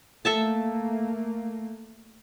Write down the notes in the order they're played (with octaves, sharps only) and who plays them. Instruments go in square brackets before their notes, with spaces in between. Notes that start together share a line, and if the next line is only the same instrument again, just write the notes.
[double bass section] A3 A#3 [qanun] A4 E5 A5